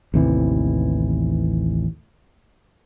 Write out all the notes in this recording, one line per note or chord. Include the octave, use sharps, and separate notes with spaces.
A1 D#2 C3 E3